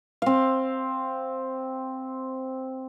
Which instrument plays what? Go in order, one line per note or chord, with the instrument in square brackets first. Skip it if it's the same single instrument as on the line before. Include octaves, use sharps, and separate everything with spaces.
[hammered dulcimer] C4 F5